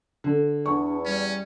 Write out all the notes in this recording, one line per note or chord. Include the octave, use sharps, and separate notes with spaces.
D3
E2 D4 C#6
G3 C#4